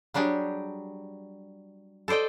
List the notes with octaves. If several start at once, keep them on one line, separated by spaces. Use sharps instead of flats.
F#3 G3 D4 G4 G#4
A4 C5 D5 D#5 G5